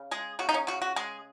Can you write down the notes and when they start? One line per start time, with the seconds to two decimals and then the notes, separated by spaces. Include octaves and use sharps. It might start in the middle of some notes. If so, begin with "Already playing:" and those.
Already playing: C#3
0.11 G#3 G#4
0.39 C#3 F#4
0.49 D#4
0.54 C#4
0.67 C#3 F#4
0.82 F#4
0.96 G#3 G#4